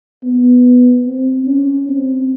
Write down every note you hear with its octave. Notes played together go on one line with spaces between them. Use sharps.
B3
C4
C#4
C4